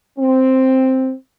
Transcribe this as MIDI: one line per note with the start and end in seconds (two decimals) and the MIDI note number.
0.19 1.13 60